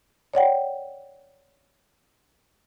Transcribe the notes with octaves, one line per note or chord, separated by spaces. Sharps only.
C#5 D5 F#5 G5